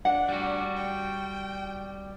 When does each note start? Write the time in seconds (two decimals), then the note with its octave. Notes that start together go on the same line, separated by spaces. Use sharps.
0.05 D4 F#5
0.28 G3 F#4
0.76 G5